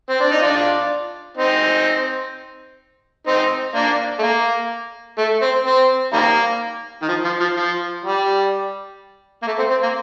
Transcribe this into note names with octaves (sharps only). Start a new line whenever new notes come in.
C4
D4
D#4
D4 F4
C4 D#4
C4 D#4
A#3 D4
A3
A#3
A3
C4
C4
D#3 G3 A#3
D#3
F3
F3
F3
F3
G3
A#3
A3
C4
C4
A#3